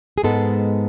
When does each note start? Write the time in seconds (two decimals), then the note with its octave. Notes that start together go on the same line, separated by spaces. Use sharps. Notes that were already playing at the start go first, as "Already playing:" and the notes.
0.18 G#4
0.23 G#2 G#3 B3 A4